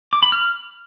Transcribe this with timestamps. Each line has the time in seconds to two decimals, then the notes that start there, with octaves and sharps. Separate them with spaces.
0.13 D6
0.22 B5
0.32 F6